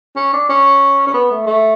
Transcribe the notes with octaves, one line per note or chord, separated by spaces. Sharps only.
C#4
D4
C#4
C#4
B3
A3
A3